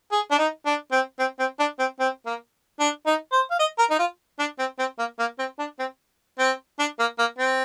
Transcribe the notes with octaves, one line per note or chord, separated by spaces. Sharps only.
G#4
D4
D#4
D4
C4
C4
C4
D4
C4
C4
A#3
D4
D#4
C5
F5
D#5
A#4
D#4
F4
D4
C4
C4
A#3
A#3
C4
D4
C4
C4
D4
A#3
A#3
C4